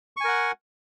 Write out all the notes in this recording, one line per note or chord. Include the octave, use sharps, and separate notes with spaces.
A#4 F#5 G#5 C#6